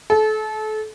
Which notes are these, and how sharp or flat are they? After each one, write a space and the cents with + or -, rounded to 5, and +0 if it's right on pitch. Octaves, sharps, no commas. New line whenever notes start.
A4 -30